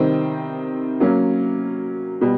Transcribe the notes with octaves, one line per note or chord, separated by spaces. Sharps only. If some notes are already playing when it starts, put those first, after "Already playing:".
Already playing: C3 D#3 G3 C4
F#3 A#3 C#4
B2 G3